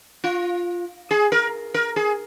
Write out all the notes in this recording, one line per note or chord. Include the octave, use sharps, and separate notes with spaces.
F4
G#4
A#4
A#4
G#4